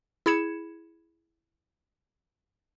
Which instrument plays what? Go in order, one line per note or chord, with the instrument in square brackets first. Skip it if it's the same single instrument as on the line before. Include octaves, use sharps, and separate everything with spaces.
[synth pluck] E4 G#4 B5 G#6 C#7 E7